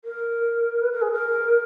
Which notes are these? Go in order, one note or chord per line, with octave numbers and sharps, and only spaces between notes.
A#4
B4
A#4
G#4
A#4